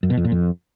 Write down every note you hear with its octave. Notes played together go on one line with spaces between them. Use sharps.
F#2
B2
F2
A#2
F2